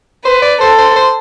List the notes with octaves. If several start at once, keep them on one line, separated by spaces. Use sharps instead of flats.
B4 C5
D5
A4 C5
C5
C5